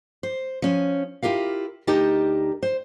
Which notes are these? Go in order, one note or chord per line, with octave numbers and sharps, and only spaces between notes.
C5
F3 C#4
E4 F4 G4 A#4 F5
D2 D#4 G4 A#4 D#5 A5
C5